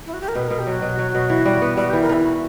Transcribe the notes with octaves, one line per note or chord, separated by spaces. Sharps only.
E4
F#4
G4
A#4
B2 B4
B2 A#4
G4
F#3 F#4
B2
F#3
B2
E3
G3
B3
G3 F#4
E3 G4
A#4
E3 E4
F#4